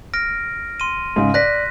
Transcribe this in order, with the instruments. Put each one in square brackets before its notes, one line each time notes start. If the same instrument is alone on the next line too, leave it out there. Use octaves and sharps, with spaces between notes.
[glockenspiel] F6 A#6 D7
C6 D#7
[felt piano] G#2 C#3
[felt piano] D5 [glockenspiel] F#6 A#6 B6